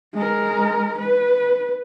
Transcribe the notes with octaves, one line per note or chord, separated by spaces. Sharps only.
G#3 A#4
B4